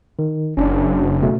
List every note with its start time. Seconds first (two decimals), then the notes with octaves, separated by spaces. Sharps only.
0.19 D#3
0.57 F#1 C#4 D4
1.22 B2 A3